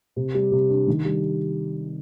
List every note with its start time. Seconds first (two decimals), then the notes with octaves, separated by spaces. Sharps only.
0.16 C3
0.35 G3
0.52 C3
0.69 D4
0.87 D#3
1.05 G3